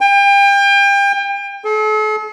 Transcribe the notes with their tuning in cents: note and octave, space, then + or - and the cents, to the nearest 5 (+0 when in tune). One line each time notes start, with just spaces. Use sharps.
G5 +35
A4 -45